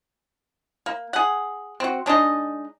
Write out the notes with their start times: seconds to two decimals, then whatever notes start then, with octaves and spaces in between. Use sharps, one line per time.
0.86 A#3
1.13 G#4 F#5
1.80 C4 F#4
2.06 G#3 D4 D#4 D#5